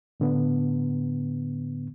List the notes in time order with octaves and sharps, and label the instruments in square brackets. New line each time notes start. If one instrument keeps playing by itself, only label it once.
[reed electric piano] A2 D3 B3